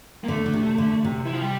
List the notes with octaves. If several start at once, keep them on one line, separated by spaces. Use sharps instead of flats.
A#3
D3 A3
D3
C3
D3
C3
E3
F3
G3